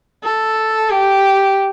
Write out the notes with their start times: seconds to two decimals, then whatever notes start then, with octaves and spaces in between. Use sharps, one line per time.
0.23 A4
0.90 G4